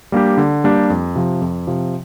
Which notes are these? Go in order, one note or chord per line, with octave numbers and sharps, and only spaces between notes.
G3 A#3 D4 G4
D3
G3 A#3 D4 G4
F2
C3 F3
F2
C3 F3